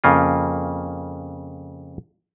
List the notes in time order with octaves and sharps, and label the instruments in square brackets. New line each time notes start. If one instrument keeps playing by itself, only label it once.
[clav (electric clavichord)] F2 C#3 A#3 F4